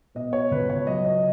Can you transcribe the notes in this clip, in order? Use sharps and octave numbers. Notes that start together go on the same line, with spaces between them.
B2 D#5
C#5
C#2 B4
C#5
F#3 D#5
D#5